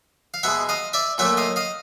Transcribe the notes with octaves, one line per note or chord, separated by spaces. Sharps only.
F5
B2 G#3 E5 F#5
D#5 F5
D5 E5
A#2 F#3 A3 E5 F#5
D#5 F5
D#5 F5